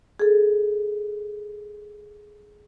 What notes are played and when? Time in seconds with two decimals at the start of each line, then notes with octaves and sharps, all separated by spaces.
0.20 G#4 A4